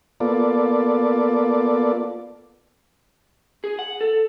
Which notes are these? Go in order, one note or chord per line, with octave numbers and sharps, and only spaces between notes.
A#3 B3 F4 A4 D5
G#4
F#5
A4